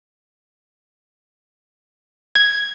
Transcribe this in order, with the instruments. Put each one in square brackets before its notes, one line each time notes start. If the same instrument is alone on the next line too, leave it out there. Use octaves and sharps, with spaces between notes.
[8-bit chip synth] G#6